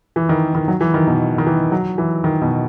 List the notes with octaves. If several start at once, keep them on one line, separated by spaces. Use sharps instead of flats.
E3
D#3
D#3
F#3
E3
D#3
B2
D#3
E3
F#3
E3
D#3
B2